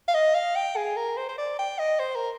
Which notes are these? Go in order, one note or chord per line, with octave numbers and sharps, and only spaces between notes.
F5
D#5
F5
G5
G#4
A#4
C5
C5
D5
G5
D#5
C5
A#4